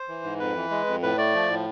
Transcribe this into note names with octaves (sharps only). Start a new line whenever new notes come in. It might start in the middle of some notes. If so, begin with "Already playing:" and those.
Already playing: C5
E3
G#2
F2 B4
E3
G#3
F2
A2 B4
A3 D5
F3
A2